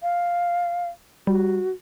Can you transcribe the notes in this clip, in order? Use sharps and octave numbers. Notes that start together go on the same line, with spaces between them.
F5
G3 F#4